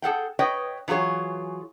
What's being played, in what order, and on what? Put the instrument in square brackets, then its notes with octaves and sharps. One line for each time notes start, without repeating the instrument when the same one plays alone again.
[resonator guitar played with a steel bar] G#4 A4 F#5 G5
B4 C#5 D#5 G5
E3 F#3 F4 G#4 C#5